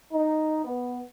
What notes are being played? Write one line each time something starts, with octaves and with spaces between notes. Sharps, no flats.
D#4
B3